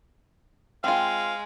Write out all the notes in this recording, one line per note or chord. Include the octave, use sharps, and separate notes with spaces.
G#3 C4 F4 F5